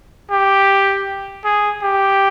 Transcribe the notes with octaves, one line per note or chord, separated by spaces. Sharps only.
G4
G#4
G4